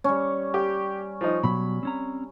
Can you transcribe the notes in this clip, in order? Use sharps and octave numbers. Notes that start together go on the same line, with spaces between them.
G3 C#4
G4
F3 D#4
B2 F#3 B5
C4 C#4 A#5